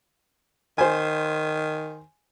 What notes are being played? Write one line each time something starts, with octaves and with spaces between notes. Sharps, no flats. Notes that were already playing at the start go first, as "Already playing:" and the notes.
D#3 C5 G#5